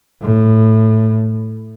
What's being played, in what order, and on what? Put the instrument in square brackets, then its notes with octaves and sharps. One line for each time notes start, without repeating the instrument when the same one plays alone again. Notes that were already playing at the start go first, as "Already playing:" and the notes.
[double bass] A2